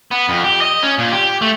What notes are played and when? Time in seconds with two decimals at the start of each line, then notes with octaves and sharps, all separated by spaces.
0.11 B3
0.29 F2
0.44 G4
0.61 D#5
0.83 C#4
0.98 A#2
1.12 G4
1.42 A3